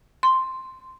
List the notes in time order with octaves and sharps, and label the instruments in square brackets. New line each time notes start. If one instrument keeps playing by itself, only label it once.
[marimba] C6